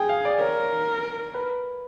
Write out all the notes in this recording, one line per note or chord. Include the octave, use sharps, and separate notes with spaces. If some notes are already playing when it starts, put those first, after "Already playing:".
Already playing: G#4 G5 G#5
F5
D5
A#4 C#5
B4